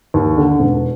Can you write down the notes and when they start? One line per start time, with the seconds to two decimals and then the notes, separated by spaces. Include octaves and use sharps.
0.14 D#2
0.37 D3
0.60 E1